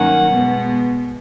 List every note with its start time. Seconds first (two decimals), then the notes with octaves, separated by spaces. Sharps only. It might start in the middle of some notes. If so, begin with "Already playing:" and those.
Already playing: G2 D#3 F#3 A#3 C#4 F#5
0.31 B2 G#3 B3